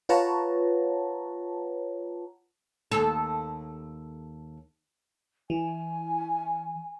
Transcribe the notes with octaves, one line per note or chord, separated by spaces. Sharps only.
F4 B4 C#5 F#5 A5 A#5
D#2 A4
E3 G#5